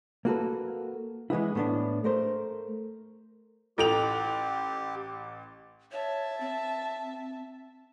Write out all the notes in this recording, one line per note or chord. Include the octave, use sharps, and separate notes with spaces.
A#3 F#4 A4 B4
E3 G#3 B3 E4
A2 B3 D4
A3 A#4 C5
A1 E4 F4 G4 A4 G5 F7
C#5 E5 A5
C4